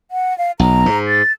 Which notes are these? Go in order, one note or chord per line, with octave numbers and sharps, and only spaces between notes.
F#5
F5
B1 A#5
G#2
A6